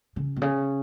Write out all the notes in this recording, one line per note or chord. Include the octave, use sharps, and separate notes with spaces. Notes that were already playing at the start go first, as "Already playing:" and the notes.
C#3
B2
C#3